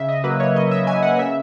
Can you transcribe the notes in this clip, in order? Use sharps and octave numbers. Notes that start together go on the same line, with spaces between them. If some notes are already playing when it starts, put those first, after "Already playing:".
Already playing: C#3 E5
D#5
F#3 A#3 B4
C#5
C#3 D#5
E5
F#3 A#3 G#5
F#5
C#3 E5